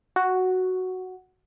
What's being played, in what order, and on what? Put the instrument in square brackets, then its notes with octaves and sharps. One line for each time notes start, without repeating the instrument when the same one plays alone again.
[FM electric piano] F#4